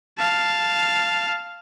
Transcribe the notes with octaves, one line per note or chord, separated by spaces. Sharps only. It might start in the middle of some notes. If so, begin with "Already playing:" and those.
F5 A5